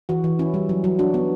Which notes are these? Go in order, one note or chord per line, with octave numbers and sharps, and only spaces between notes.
E3 F#4
E3
C#4 E4
G3
F#3
F#3
D4 F#4
B3